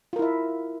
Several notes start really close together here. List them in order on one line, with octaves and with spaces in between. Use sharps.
F4 A#4 E4 E5